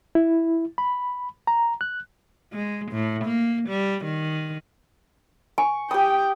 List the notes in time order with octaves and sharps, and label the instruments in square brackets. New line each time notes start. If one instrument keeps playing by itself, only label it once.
[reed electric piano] E4
B5
A#5
F#6
[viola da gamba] G#3
A2
A#3
G3
D#3
[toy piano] G#5 [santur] C#6
[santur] G4 D#6 [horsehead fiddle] G5